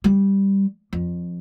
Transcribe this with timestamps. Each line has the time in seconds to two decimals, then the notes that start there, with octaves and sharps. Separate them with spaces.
0.04 G3
0.93 F2